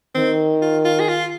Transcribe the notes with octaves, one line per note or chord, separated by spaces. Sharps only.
D#3 C4
F4
F4
G#4
F4